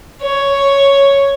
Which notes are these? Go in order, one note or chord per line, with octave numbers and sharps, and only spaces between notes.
C#5